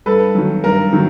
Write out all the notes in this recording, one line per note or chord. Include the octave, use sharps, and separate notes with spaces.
G2 A4 B4
D#3 F#3
G2 A#4
D#3 F#3